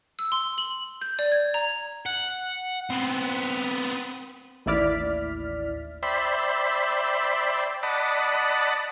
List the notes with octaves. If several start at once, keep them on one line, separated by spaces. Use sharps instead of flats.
E6
C6
F#7
G6
D5
G#6
A#5
F#5
B3 C4
A1 D#2 E4 D5 F6 B6
C5 D5 E5 G5 B5
D5 D#5 F#5 A5 B5